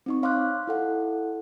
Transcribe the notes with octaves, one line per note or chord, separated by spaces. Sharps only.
C4 D#4 C#6
C#5 F5 C6 D6 F6 F#6
E4 A4 F#5